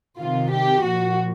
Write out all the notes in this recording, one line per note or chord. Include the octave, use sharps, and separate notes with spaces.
C3 D#3 F4
G4
A#2 F3 F#4